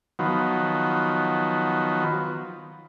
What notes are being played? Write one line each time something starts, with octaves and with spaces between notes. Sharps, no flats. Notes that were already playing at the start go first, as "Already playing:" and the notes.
D#3 F3 F#3 B3